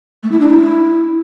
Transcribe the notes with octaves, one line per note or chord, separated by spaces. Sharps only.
A3
E4
D4
E4